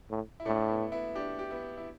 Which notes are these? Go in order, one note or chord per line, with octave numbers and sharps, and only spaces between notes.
A2
E4
A2 A3 D4
B3 E4
B3 E4
D4 G4
G4
B3 E4
E4